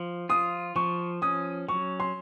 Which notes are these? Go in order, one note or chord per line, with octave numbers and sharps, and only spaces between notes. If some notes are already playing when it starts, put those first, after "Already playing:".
Already playing: F3
F4 D#6
F3 C#6
C#4 D#6
F#3 C#6
C6